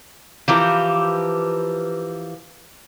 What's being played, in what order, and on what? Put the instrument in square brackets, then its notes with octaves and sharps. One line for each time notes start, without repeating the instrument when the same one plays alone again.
[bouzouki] E3 F3 G4 A#4